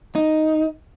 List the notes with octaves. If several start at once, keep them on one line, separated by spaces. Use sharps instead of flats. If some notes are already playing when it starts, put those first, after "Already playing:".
D#4